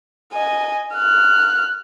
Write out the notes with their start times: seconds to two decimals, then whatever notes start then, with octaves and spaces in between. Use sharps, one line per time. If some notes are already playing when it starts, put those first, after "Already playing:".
0.33 D#5 G#5
0.95 F6 F#6